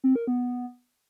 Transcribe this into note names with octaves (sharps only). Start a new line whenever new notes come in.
C4
A#4
B3